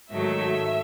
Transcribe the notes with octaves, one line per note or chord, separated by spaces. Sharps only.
G#2 D#3 F#3 A3 E5